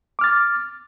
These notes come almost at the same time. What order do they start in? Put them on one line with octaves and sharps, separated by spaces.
D6 F6 A6